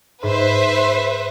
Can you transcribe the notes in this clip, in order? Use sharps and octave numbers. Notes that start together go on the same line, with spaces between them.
G#2 B4 C5 E5